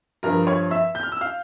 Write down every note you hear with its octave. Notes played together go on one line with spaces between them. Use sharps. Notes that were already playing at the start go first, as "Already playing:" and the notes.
G2 F3 A#4 A#5
C#5 C#6
E5 E6
G6
F6
E6
F5 F6